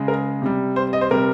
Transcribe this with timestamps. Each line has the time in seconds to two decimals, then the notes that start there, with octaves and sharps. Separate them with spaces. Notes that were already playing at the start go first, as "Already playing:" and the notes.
Already playing: C#3 G#3
0.08 A#4
0.42 C3 G3
0.76 C5
0.93 D#5
1.01 C5
1.10 C3 G3 A#4